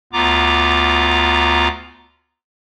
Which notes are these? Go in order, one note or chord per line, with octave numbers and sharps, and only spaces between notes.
D2 B3 F4 A#5 D6